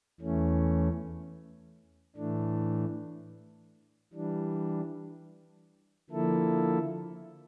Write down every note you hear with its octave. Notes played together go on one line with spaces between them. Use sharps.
E2 E3 A3 C#4
A2 E3 A3 D4
E3 G3 D4
D3 F3 A#3 E4 A4